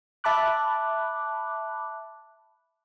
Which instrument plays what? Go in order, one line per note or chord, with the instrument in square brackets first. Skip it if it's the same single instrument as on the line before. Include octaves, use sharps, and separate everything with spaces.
[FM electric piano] E5 A5 B5 D6 F#6